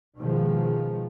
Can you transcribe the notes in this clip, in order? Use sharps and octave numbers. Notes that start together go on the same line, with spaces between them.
B2 D#3 F3 G#3